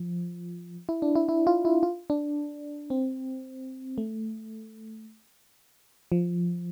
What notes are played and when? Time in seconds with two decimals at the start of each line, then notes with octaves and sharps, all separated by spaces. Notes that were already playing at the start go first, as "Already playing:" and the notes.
Already playing: F3
0.89 E4
1.02 D4
1.16 E4
1.29 E4
1.47 F4
1.65 E4
1.83 F4
2.10 D4
2.90 C4
3.98 A3
6.12 F3